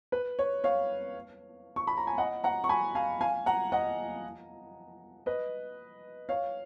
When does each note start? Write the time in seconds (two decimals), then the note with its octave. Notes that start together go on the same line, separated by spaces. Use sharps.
0.12 B4
0.39 C#5
0.64 C#5 F5
1.76 C#6
1.87 B5
1.97 A#5
2.07 G#5
2.18 D#5 F#5
2.44 F#5 A#5
2.64 C#6
2.69 G#5 B5
2.95 F5 G#5
3.21 F5 G#5
3.46 F#5 A#5
3.72 D#5 F#5
5.26 B4 D#5
6.29 C#5 F5